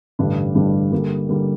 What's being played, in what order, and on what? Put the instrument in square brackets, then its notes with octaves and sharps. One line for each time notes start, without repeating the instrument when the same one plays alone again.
[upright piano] A1 G2 D3 G3 D4
A1 G2 D3 G3 D4
D3 G3 A#3
D3 G3 A#3